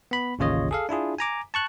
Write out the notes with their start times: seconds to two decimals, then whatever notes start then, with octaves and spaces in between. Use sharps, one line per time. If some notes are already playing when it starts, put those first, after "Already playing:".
0.11 B3 B5
0.39 A1 D#2 C#3 F4 C#5 D#5
0.71 G#4 A4 F5
0.89 D4 E4 F4 G#4
1.18 G#5 A#5 D6
1.54 A5 C#6 F#6